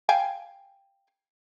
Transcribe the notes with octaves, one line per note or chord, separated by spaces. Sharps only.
F5 G5 G#5